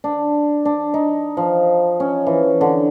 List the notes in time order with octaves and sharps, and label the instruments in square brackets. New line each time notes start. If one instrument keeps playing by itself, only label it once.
[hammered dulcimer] D4
D4
D#4
F3
C#4
E3
D3